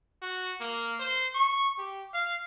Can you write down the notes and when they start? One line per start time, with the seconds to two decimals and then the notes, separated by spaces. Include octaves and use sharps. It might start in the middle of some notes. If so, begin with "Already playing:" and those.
0.22 F#4
0.60 A#3
1.00 C5
1.35 C#6
1.78 G4
2.14 F5